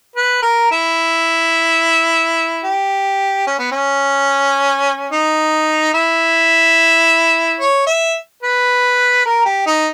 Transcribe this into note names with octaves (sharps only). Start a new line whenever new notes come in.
B4
A#4
E4
G4
C#4
B3
C#4
D#4
E4
C#5
E5
B4
A#4
G4
D#4